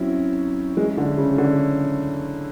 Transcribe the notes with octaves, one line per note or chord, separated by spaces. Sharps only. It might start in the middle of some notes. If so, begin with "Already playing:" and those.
Already playing: F#3 C4 C#4 E4
G#3
D3
C#3
D3